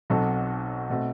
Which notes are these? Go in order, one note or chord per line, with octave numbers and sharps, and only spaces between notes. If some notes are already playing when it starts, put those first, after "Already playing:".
B1 B2 F#3 C4 F#4 A4
B2 A3 C4